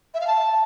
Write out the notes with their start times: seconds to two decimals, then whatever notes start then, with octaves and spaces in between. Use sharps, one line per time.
0.14 E5
0.21 F5
0.27 A5